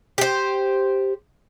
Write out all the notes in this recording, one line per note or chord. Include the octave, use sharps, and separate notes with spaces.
G4 C5